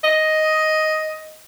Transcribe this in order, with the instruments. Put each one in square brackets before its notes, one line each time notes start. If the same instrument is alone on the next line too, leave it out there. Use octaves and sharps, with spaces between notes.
[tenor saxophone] D#5